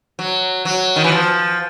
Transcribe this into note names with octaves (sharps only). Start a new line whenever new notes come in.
F#3
F#3
D#3
E3
F3